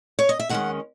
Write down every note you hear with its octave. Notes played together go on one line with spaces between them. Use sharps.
C#5
D#5
E5
D#2 D#3 G#3 C#4 F#5